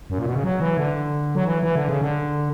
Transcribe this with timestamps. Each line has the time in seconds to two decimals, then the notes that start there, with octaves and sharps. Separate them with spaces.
0.10 F#2
0.19 A#2
0.26 B2
0.35 C#3
0.44 F#3
0.60 E3
0.77 D3
1.35 F#3
1.45 E3
1.63 E3
1.75 D3
1.89 C#3
2.01 D3